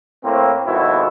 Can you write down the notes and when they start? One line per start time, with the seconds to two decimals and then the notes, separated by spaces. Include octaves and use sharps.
0.24 A2 A#3 C4
0.66 G#1 F2 B2 B3 E4